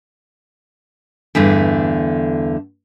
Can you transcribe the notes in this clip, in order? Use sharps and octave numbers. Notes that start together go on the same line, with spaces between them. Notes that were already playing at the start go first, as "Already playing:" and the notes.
E2 G2 D3 A3